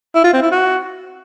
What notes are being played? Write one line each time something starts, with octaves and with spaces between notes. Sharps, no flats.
E4
F4
C4
E4
F#4